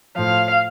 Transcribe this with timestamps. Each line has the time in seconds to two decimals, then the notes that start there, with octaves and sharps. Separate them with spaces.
0.15 A2 F3 F5